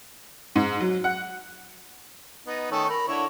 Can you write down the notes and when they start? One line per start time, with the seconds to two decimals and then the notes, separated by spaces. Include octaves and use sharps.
0.56 G#2
0.80 F#3
1.04 F#5
2.46 B3 D#4
2.71 D#3 A3 C#4
2.90 A#4 B5
3.08 D3 E4 C#5